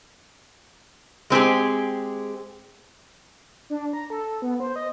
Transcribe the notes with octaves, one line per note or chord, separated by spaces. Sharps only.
G#3 C4 G4 G#4
D4
A#5
A4
B3
C5
D#5